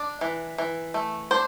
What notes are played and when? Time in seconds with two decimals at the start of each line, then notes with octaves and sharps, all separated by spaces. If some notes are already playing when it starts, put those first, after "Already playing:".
Already playing: D4 D5
0.21 E3
0.58 E3
0.94 A3
1.31 D4 C5